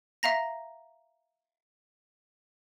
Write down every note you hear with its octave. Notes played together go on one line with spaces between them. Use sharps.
E5 F5 A#5 A#6